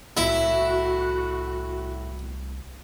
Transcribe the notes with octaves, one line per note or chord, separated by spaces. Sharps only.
C2 A2 E4 F#4 E5